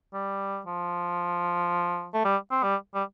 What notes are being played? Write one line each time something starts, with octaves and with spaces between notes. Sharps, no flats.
G3
F3
A3
G3
C4
G3
G3